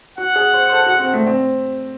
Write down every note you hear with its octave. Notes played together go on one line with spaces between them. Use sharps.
F#4 F#5
G#4
C5
C5
A4
F#4
C4
A3
C4